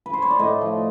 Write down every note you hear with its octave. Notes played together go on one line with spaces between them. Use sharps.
B4
C5
C#5
D5
A2 D#5
F3